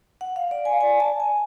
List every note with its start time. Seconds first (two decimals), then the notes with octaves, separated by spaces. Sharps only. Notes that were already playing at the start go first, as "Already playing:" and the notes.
0.21 F#5
0.36 F5
0.51 D5
0.65 G#5
0.72 F5
0.81 D5 G#5
1.00 A5
1.20 G#5